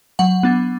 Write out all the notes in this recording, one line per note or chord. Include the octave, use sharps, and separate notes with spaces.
F#3 F#5
B3 D4